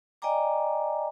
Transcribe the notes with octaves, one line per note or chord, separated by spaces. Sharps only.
D5 D#5 G5 G#5 A#5 D6